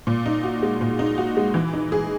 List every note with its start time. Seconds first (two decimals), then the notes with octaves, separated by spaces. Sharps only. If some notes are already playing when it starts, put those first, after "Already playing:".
0.07 A#2
0.26 D#4
0.44 F#4
0.63 G#3
0.81 A#2
0.99 D#4
1.18 F#4
1.37 G#3
1.54 E3
1.73 D#4
1.92 G#4